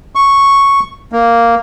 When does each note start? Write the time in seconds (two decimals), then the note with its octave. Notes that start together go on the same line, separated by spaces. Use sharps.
0.15 C#6
1.12 A#3